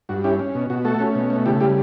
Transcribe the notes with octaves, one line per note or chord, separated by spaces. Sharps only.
G2 F#4
C#4 E4 G4
C#4
B2
B2 F#4
A3 F#4 A4
C#4
B2
A3
C#3 E4 G4
G3 E4 G4